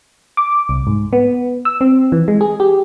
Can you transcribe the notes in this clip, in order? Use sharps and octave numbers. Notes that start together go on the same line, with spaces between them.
D6
C2
G#2
B3
E6
C4
E3
G#3
G#4
G4